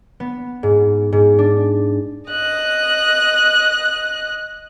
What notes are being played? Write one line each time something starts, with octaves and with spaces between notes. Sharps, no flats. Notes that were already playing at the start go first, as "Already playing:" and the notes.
B3
G#2
G#2
D4
D#5 F#6